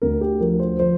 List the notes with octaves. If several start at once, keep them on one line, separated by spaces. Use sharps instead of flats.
D2 A#4
G4
F3 A#4
C5
F3 C5